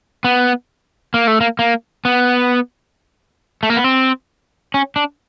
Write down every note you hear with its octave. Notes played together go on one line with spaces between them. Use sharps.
B3
A#3
A3
A#3
A#3
B3
A3
A#3
B3
C4
C#4
D4